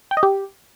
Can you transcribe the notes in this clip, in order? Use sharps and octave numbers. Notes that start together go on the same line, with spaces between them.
G5
D#5
G4